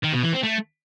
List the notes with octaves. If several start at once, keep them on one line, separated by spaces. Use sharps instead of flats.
D#3
B2
E3
C4
A3